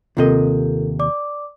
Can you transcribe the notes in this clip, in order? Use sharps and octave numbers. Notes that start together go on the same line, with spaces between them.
D#2 C3 F4 A4 A#4 D#5
D5 D6